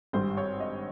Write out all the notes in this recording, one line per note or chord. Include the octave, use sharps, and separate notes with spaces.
G#1 G2 G3 C5
C#5
D#5